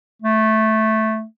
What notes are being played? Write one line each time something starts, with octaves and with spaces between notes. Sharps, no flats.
A3